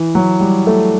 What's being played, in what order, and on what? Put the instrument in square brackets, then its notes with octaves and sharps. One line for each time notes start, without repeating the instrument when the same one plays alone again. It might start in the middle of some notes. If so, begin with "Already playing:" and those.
Already playing: [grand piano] E3
F#3
G3
A3